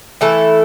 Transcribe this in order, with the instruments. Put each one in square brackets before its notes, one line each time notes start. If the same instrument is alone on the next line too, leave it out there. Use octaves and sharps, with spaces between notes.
[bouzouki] E3 A3 E4 A4